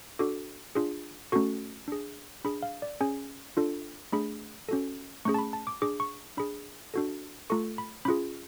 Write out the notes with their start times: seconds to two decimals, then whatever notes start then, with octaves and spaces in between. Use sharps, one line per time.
0.19 D4 F#4 A4 D6
0.75 D4 F4 G#4
1.32 A3 C#4 F#4 A4 C#6
1.88 D4 G#4
2.45 D4 G#4 B5
2.63 F5
2.82 D5
3.01 C#4 G#4 G#5
3.57 D4 F4 A4
4.12 A3 D4 G#4 B5
4.69 C#4 F#4 A4
5.25 A3 C#4 G#4 C#6
5.34 A5
5.39 B5
5.53 A5
5.67 D6
5.82 D4 G#4 D6
6.00 C#6
6.37 D4 G#4 B5
6.94 D4 F#4 A4
7.50 A3 F4 A4 C#6
7.78 B5
8.05 C#4 F4 G#4 B5